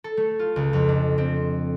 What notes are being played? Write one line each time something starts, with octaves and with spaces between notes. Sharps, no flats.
A4
A3
F4
C#2
F2
D4
C4